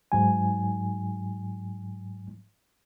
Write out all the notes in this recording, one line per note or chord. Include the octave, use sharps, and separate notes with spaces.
G#2 F#3 G#5